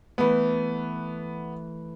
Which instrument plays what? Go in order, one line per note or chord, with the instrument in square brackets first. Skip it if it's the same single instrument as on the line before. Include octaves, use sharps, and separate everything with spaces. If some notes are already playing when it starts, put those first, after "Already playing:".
[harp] E3 A3 [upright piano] B3